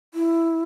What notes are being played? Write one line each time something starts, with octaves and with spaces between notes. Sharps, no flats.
E4